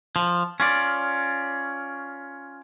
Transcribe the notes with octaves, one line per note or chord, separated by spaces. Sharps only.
F3
C#4 F4 D5